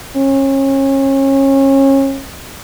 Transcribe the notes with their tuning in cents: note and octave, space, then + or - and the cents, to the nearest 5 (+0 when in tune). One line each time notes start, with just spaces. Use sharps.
C#4 -30